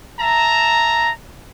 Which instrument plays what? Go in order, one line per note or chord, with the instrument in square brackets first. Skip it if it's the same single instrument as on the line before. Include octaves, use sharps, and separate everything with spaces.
[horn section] E5 A5 A#5